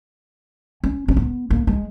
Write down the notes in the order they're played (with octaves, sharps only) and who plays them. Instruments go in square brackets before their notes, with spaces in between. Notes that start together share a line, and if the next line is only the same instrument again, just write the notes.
[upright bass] C#4
C#4
B3
A#3
G#3